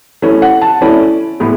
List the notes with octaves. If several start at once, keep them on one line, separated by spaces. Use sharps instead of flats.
E3 A3 C#4 E4
F#5
A5
E3 A3 C#4 E4 D5
A2 E3 G#3 B3 E4